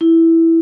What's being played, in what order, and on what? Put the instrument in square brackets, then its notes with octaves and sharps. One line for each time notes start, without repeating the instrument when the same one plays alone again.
[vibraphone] E4